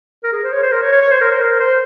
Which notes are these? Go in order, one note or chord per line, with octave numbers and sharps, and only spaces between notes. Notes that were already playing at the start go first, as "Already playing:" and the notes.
A#4
G#4
C5
C#5
C5
A#4
C#5
C#5
C#5
C5
A#4
C5
A#4
C5